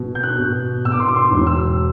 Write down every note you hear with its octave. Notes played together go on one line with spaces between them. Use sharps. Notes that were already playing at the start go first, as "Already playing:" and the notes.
Already playing: B2
G6
F#6
B2
B2 E6
D6
C6
D6
C6
E1
E6